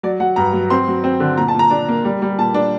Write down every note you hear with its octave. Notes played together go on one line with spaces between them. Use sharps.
F#3 D5
F#3 F#5
G2 A#5
F#3
C4 C6
F#3
C4
D3
A#2 A#5
A5
A#2 A#5
D4
A#3
G3
G3
A#2 A5
D4